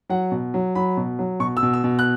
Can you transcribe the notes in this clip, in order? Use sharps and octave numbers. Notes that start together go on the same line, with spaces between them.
F#3 F#5
B2
F#3
F#3 B5
B2
F#3
B2 C#6
E6
B2
E6
B2
F#6